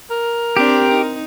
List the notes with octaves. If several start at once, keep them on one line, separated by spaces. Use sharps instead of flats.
A#4
C4 D4 G4
D#4